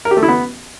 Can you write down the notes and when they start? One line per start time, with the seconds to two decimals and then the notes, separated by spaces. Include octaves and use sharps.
0.05 A#4
0.11 G4
0.17 A3
0.23 E4
0.28 B3